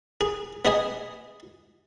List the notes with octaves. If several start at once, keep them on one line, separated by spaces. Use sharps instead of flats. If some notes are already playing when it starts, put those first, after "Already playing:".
G#4
B3 G#4 D#5 G#5